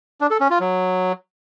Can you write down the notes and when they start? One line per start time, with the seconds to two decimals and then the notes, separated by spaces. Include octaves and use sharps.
0.21 D4
0.31 A4
0.41 C#4
0.50 F4
0.60 F#3